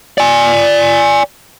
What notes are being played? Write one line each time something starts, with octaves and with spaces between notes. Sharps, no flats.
D5 G#5